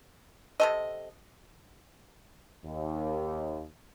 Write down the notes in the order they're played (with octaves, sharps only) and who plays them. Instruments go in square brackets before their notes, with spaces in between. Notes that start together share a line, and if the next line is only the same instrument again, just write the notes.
[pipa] C3 A4 D#5
[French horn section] D#2